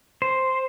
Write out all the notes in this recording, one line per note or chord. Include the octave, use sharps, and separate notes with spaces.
C5